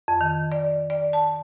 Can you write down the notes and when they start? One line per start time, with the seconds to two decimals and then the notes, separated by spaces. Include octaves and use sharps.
0.08 F2
0.21 D#3
0.52 D5
0.90 D5
1.13 A5